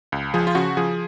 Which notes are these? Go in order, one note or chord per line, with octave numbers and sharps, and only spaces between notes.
C#2
F3 G#4
F4
C#3 F#4
F3 G#4